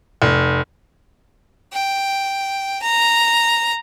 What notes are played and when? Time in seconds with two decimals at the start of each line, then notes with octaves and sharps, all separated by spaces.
0.22 F1
1.73 G5
2.82 A#5